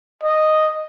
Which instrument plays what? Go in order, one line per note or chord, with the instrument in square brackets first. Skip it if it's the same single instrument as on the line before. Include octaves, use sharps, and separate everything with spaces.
[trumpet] D#5